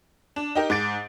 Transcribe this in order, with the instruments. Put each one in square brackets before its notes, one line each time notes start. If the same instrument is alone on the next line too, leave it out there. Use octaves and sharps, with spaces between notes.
[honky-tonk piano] D4
D#4 G4 A#4
G#2 D6 A6 D7